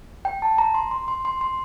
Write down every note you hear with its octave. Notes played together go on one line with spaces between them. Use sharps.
G5
A5
A#5
C6
C6
C6
C6
C6